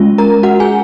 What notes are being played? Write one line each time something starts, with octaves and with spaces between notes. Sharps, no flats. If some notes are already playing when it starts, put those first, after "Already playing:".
Already playing: G#3 C#4 F4
A#4 A#5
F#4 F#5
G#4 G#5